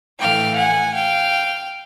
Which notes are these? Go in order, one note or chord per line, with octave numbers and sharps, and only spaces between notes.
A2 E3 A3 F5 G5
F#5 G#5
F5 G5